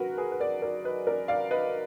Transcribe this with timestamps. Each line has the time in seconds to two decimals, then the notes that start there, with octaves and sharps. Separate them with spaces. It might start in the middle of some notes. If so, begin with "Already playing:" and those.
Already playing: F#3 F#4 A#4 B4
0.17 G#4 B4
0.32 B4
0.40 A#4 D5
0.62 A#4 D5
0.84 B4 D#5
1.07 A#4 D5
1.28 D5 F5
1.51 B4 D#5